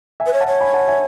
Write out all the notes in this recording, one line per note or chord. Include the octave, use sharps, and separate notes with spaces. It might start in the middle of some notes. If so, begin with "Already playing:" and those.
E5 G#5
B4
C#5
F#5 A5
C#5
G#5 B5
F#5 A5
E5 G#5